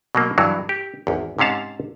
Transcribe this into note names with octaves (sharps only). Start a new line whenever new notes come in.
B2 F#3 A#3
G2 E3 F#3
G4
G#1 E2
G#2 C3 C#4 F5 A5